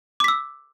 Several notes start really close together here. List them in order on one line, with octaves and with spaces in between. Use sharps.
D6 B6 E6